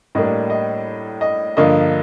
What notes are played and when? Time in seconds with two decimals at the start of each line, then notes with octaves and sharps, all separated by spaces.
0.15 A2 G3 A#3 D4 D#5
0.50 D#5
1.21 D#5
1.57 G2 D3 F3 A#3 D#5